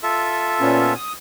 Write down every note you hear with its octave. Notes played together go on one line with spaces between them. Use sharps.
F4 A4 E5
A#2 B3 C#4
D#6